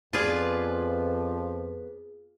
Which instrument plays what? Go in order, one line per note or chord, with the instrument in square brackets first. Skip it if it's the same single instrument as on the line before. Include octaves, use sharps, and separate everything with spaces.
[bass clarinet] F2 [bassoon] F3 [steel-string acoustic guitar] B3 B4 D5 [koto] F4 G#4